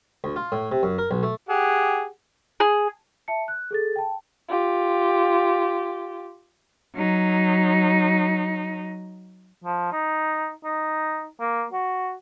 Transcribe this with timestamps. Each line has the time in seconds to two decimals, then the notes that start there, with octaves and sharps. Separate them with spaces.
0.24 D2
0.36 F4
0.52 A2
0.72 C3
0.83 F#2
0.98 A#4
1.11 B1
1.23 A3
1.49 G4 G#4 F#5
2.60 G#4
3.28 E5 A5 C#7
3.48 F#6
3.71 G#4 A4 A6
3.96 G5 A5
4.48 F4 G4
6.95 F#3 D#4
9.64 F3
9.92 D#4
10.65 D#4
11.40 A#3
11.72 F#4